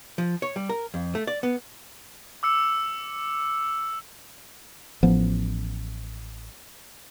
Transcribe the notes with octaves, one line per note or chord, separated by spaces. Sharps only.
F3
C#5
G3
A#4
F2
A3
D5
B3
D6 E6 C#7
A1 F3 B3